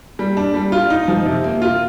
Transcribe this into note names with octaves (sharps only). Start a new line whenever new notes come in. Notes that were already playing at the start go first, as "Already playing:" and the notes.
G3
D4
G3
F4
D#4
F3
C3
A#3
F4